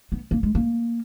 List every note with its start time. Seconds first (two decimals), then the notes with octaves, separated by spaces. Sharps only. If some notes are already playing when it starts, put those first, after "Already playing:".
0.12 B3
0.31 A#3
0.43 G#3
0.55 A#3